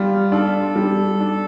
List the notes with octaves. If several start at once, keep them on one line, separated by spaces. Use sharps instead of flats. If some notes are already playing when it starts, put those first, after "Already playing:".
Already playing: G3 F4
D4 A4
G3
D4